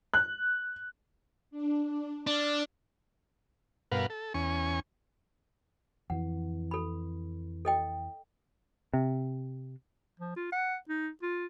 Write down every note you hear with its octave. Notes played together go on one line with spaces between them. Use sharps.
F#6
D4
D4
D4 F6 A6
G2 B2 A#4 B4 F5 F#5
A4
E2 C#4 G#5 C#6
F2 E3 F#5
A4 B5
A4 D#5 G5
C3
F3
F4
F#5
D#4
F4